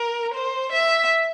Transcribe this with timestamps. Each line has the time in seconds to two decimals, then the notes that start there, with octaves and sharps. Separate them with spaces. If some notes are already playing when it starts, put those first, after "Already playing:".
Already playing: A#4
0.34 C5
0.72 E5